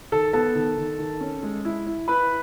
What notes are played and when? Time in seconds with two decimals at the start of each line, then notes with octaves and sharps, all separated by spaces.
0.12 D#3 A4 A5
0.33 B3 A4 A5
0.55 D#3
0.78 D#3
0.99 D#3
1.20 C#4
1.43 G#3
1.65 E4
1.86 E4
2.08 E4 B4 B5